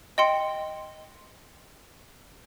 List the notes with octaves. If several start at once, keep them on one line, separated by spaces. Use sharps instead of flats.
D#5 G5 C6 C#7